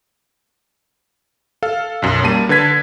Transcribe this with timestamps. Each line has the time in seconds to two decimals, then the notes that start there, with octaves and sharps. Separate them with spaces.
1.63 A4 F5
2.02 B1 F#2
2.24 G3 A#3 A5 D#7
2.49 D3 B4 A5 G#6 B6